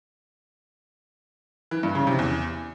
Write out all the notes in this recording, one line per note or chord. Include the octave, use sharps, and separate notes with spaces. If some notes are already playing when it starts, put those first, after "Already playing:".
E3
G2
C#3
C3
E2